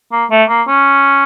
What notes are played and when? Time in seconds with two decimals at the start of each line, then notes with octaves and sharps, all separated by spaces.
0.12 A#3
0.31 A3
0.49 A#3
0.67 C#4